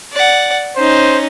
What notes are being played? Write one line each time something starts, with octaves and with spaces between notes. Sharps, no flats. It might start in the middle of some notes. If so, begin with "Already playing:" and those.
D5 F#5
C#4 D#4 C5